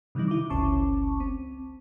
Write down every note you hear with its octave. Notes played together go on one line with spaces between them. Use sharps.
C3 D#3 E3 G3 D#4
E4 D6
G1 C#2 C#4 A5 C#6 D6
C4